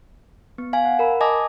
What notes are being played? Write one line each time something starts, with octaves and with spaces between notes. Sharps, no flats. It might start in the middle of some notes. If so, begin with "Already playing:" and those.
B3
F5 G#5
F#5
A#4 B5
D#5 G#5 A5 D6 D#6 A#6